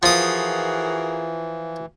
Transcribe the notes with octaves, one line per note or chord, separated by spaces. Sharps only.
E3 F3 F#4 G#4 A#4 D#6